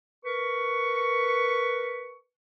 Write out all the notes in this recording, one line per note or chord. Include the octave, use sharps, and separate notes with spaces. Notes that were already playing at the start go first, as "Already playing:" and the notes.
A#4 B4 C#6